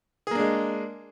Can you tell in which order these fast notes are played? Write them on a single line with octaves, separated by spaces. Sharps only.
G#4 A#3 D4 G#3